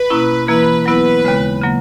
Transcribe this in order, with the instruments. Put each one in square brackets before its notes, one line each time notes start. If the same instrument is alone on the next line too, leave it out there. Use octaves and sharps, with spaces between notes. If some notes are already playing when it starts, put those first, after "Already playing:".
Already playing: [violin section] B4
[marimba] B2 A#3 C#4 E4
[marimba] E3 A#3 E4 [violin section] B4
[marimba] F#3 B3 E4 [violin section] B4
[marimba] D#2 C#3 G#3
C#3 F#3 A#3